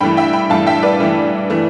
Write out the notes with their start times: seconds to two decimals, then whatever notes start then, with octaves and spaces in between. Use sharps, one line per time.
0.01 G2 E3 A3 G5 B5
0.17 E5 G5
0.33 G5 B5
0.50 G2 E3 A3 F5 A5
0.67 E5 G5
0.83 B4 D5
1.00 G2 E3 A3
1.50 E3 A3